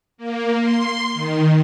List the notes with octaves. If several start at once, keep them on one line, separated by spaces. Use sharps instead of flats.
A#3
C6
D#3